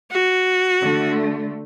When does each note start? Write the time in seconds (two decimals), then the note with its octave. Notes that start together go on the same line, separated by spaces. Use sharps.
0.11 F#4
0.80 D3 A3